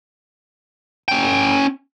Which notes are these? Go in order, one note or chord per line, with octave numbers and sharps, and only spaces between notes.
C#4 G5